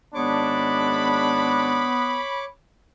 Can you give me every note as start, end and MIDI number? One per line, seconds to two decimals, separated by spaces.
0.15 1.91 32
0.15 1.91 56
0.15 2.20 59
0.15 1.91 62
0.15 2.44 73
0.15 2.49 83
0.15 2.44 86